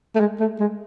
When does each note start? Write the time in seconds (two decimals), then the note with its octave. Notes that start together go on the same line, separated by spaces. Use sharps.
0.15 A3
0.20 G#3
0.40 A3
0.60 G#3